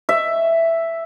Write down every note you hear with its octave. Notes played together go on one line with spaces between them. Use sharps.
E5